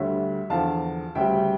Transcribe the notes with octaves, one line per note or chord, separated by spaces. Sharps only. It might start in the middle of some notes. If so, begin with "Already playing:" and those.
Already playing: D2 D3 G3 C#5 E5
E2 D3 F3 F5 A5
D2 C#3 G3 E5 G5